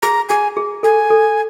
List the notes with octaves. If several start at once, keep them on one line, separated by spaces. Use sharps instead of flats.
G#4 A#5
G#4 G#5
G#4
A4 G#5
A4